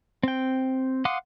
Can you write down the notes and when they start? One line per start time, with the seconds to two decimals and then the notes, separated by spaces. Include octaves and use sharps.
0.23 C4 G5
1.05 F5 F#5 C6 D6 D#6